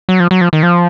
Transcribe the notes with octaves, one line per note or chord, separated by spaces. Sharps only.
F#3
F3
F#3
F3
D#3
F3